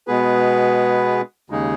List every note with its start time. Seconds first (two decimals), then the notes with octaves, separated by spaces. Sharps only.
0.07 B2 G#3 B3 G#4 B4
1.50 D#2 C#3 G#3 D#4 G#4